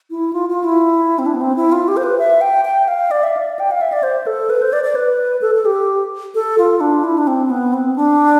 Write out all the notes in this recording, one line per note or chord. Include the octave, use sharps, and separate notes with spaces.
E4
F4
F4
E4
C4
D4
B3
C4
E4
F4
G4
C5
B4
E5
G5
G5
F5
D5
E5
D5
G5
F5
E5
D5
C5
A4
B4
C5
D5
D5
B4
A4
A4
G4
A4
F4
D4
E4
D4
C4
B3
C4
D4